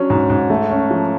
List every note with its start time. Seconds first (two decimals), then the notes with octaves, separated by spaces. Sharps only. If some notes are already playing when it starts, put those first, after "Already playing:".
Already playing: F#3 C#4 D4
0.10 G#2
0.30 G#2
0.50 A3
0.71 C#4
0.91 F3